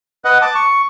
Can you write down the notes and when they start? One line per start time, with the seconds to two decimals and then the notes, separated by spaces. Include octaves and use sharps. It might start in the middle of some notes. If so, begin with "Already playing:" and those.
0.25 B4 D#5 F#5
0.42 A5 D6
0.55 C#6